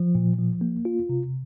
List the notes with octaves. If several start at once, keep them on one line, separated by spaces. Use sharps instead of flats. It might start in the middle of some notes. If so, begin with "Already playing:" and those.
Already playing: F3
A#2
F3
A#3
F4
C3